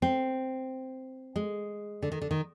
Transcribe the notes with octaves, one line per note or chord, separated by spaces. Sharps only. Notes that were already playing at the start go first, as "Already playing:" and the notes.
C4
G#3
D3
D#3
D3
D#3